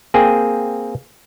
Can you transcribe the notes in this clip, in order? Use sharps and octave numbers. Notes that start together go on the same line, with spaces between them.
A#3 C4 G#4 G5 G#5